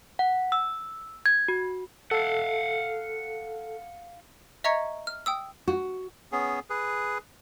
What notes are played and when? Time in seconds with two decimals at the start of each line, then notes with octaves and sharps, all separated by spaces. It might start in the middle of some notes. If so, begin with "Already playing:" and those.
0.19 F#5
0.52 E6
1.26 G#6
1.48 F#4
2.11 A4 F5 F#5
4.64 D#5 E5 A#5 C#6 G#6 C#7
5.07 F6
5.26 G5 D#6 E6
5.67 F#4
6.32 B3 C#4 G#4
6.70 G#4 B4